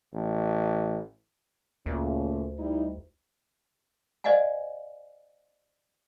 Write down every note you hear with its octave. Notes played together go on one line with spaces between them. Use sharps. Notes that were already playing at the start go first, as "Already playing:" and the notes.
A1
D2 A#2 C#3 A3
G3 D#4 E4
C5 D5 D#5 F5 F#5 G#5